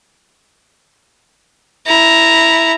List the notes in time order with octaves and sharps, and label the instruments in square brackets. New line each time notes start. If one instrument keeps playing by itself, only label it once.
[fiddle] E4 A#5